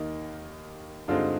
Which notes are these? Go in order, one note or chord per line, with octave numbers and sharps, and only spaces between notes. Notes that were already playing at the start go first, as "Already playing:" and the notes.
Already playing: D#2 D#3 A#3 D#4
G2 D3 G#3 C4 D#4 F4